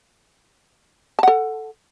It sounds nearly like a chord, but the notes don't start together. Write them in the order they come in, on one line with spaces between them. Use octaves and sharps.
A5 F#5 A4